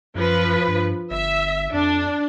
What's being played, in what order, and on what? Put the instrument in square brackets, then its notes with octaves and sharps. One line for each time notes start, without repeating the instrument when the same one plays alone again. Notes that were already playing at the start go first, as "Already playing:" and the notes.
[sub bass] F#2 [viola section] F3 B4
[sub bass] G2
[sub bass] G1 [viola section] E5
[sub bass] F2 [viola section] D4